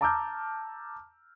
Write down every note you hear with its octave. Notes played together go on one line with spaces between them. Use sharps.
A5 A#5 D6 E6 F6 G6